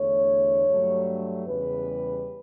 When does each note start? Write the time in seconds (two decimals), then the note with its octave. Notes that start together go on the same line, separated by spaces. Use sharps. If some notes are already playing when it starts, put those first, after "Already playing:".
Already playing: E2 D3 A3 C#5
0.67 G2 F#3 A3
1.47 E2 C#3 G3 B4